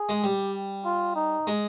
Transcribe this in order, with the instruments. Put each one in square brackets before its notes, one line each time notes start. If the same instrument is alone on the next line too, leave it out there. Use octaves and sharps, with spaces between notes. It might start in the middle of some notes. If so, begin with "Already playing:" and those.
Already playing: [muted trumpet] G#4
[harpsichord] G#3
[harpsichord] G3 [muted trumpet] G4
[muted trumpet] F4
D#4
[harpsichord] G#3